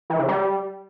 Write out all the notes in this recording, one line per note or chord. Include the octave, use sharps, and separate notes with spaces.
E3
C#3
G3